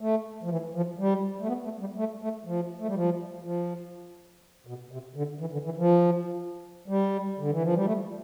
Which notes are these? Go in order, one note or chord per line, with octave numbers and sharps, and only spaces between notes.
A3
F3
E3
F3
G3
A3
B3
A3
G3
A3
A3
F3
A3
G3
F3
F3
B2
C3
D3
E3
D3
E3
F3
G3
D3
E3
F3
G3
A3